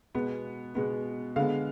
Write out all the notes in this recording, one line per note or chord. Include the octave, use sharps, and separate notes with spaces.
B2 G#3 B3
B2 G#3 B3
D3 G#3 B3 F5